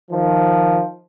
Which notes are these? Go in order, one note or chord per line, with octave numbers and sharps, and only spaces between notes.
D#3 F3